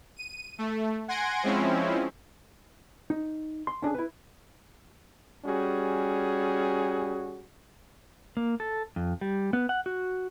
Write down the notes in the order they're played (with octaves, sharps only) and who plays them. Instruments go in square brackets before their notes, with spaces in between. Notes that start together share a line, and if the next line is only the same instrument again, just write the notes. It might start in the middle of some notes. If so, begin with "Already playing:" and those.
[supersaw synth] D#7
A3
F#5 G#5 C6 G#6 A#6 D7
F3 G#3 C4 C#4 E4
[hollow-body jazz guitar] D#4
C6
C#4 D4 F#4 G#4
E4 B4
[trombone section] G3 C#4 F#4 G#4
[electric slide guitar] A#3
A4
F2
G3
B3
F#5
F#4